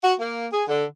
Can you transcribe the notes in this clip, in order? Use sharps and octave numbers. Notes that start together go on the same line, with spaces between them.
F#4
A#3
G#4
D3